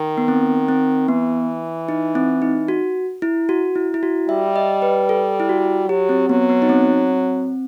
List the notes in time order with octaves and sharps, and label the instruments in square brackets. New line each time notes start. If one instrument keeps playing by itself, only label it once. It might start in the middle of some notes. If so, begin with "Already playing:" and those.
Already playing: [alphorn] D#3
[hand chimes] B3
C4
C4
[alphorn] E3 [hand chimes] B3
[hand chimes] D#4
C4
D#4
F#4
E4
F#4
E4
E4
F#4
[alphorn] G3 [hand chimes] E5
[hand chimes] D#5
B4
A4
E4
F#4
[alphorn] F#3 [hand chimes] G4
[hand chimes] C4
[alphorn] F#3 [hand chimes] B3
[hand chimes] B3
D#4
C4